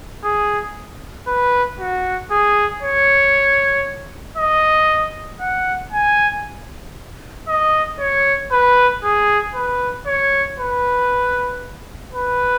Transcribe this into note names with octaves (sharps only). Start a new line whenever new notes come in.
G#4
B4
F#4
G#4
C#5
D#5
F#5
G#5
D#5
C#5
B4
G#4
B4
C#5
B4
B4